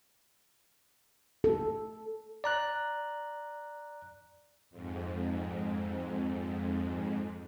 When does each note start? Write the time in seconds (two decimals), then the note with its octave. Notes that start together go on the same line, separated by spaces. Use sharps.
1.44 A4
2.44 D5 A#5 F#6
4.70 F2 G#2